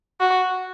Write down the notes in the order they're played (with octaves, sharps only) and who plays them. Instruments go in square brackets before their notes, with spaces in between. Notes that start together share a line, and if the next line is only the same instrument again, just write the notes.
[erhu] F#4